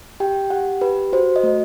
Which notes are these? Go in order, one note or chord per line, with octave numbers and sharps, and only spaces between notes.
G4 G5
G4 F#5
G4 B4
F#4 C5
D#5
A3